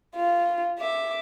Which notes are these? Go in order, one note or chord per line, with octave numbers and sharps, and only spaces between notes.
F4
E5 D6